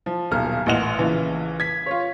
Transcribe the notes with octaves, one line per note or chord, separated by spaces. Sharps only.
F3
D#1 B1 A#5 F6
A1 A#2 D#5 F#5 F7
A#1 C#3 E3
G#6 B6
F4 C#5